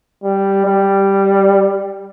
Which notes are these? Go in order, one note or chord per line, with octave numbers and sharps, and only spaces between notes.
G3
G3